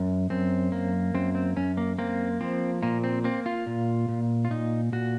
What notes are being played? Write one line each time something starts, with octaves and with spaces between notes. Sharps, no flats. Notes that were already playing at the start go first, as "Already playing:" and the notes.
Already playing: F#2
F#2 C4
A#3
F#2 C4
C4
F#2 C#4
A#3
A#3 C4
F3 C4
A#2 A#3
C4
A#3 C4
F4
A#2
A#2
F4
A#2 D#4
A#2 F#4